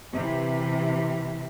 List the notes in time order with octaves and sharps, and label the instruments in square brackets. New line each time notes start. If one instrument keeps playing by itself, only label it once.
[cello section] C3 E3